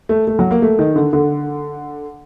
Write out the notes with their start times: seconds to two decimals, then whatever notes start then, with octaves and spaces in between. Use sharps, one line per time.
0.09 A3
0.27 A3
0.39 F#3
0.51 A#3
0.62 A3
0.79 D#3
0.96 D3
1.13 D3